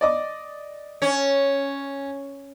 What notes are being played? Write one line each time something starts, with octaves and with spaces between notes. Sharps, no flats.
D5 D#5 D6
C#4 C#5